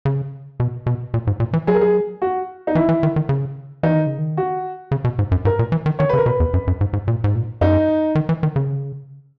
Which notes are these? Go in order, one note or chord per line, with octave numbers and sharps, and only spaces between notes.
C#3
B2
B2
A#2
G#2
A#2
E3
F#3 G#4
A#4
G#4
F#4
D#4
E3 E4
E3
D#3
D#3
C#3
E3 D#4
D#3
C#3
D#3
F#4
C#3
B2
G#2
F#2
G#2 A#4
A#2
E3
D#3
D#3 C#5
C#3 B4
A#4
B2 B4
E2
F#2
F#2
G#2
G#2
A#2
G#2
A#2
F#2 D#4
D#3
E3
D#3
C#3